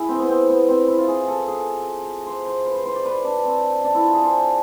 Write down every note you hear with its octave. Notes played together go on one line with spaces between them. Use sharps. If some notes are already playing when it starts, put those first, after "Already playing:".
Already playing: E4 G#4
C4
B3
C4
B3
C4
E4
F4
G#4
A4
G#4
C5
C5
B4
C5
C5
D5
B4
D4
C4
D4
E4
F4
G#4
C5